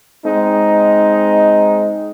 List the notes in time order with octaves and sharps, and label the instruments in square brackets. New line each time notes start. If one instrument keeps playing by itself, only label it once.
[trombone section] G#3 C4 D#4